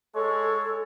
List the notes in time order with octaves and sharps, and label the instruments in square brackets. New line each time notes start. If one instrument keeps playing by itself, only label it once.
[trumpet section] G#3 C#5 [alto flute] A4